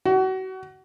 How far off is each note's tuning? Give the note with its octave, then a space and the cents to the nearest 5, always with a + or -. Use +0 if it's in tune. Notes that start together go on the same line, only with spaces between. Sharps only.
F#4 +30